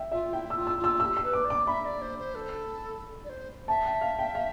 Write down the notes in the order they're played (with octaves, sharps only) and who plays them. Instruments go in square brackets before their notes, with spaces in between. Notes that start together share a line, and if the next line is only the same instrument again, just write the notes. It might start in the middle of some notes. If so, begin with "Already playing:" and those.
Already playing: [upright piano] E5 G5
[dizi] F4 [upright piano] E5
[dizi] E4 [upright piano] G5
[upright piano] E6
[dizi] F4
[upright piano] E6
[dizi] F4
[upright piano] E6
[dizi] A4 [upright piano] E6
[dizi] G4
[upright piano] E6
[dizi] B4
[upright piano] D6
[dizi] D5
[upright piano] D6
[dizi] E5 [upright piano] B5
[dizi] D5
C5
C5
A4
D5
C5
[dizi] E5 [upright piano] A5
[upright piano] G5
F5
G5
F5